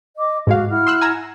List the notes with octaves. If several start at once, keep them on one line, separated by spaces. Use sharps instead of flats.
D#5 D6
G#2 G#3 F#4 F5
E4 F#5 F6
C6 E6 F#6
G#5 A#5 E6